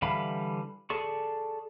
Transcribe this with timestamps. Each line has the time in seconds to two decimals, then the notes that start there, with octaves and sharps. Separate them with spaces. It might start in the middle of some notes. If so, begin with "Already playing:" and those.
0.02 D3 E3 G3 F5 B5
0.90 G#4 A4 D5 C#6